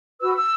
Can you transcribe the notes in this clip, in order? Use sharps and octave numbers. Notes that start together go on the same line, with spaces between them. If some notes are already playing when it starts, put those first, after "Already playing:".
F#4 B4 E6
E6